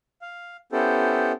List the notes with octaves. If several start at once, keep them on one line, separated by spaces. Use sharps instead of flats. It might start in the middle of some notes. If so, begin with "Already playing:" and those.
F5
B3 C#4 E4 G4 A4 C5